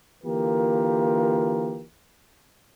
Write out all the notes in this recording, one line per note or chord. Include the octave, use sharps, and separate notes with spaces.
D3 E3 A#3 F4 G4 A#4